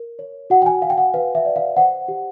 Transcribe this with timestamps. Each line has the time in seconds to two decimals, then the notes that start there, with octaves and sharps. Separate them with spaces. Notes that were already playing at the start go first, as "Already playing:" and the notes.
Already playing: A#4
0.19 C#5
0.50 F#4 F#5
0.62 G5
0.66 G#5
0.82 F#4 F5
0.90 G5
0.98 F#5
1.14 B4 F5
1.35 E5
1.45 D5
1.56 F5
1.76 C5 F#5
2.08 G4